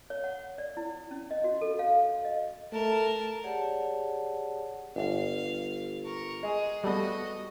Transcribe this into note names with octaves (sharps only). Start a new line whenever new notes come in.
C#5
F#5
D5
E4
C#4
D#5
F#4
A4
F5
D#5
A3 A#4 A5
G4 G#4 C#5 D5 F#5 A5
G1 F5
A#4 C#6
G#3 G#4
G3 A3 B3 F#4 D#5